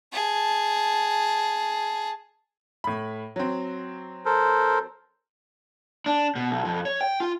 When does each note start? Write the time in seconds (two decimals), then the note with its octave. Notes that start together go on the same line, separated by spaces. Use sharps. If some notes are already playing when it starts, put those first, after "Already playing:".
0.13 G#4 A5
2.84 A2 B5
3.36 F#3 C4
4.25 A4 A#4 C5
6.06 D4
6.35 B2
6.51 B1
6.65 F2
6.85 C#5
7.01 G5
7.20 F4